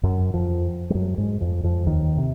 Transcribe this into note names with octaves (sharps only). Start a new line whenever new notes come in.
F#2 F#3
F2 F3
G3
F#2 F#3
G#2 G#3
F2 F3
F2 F3
D#2 D#3
C3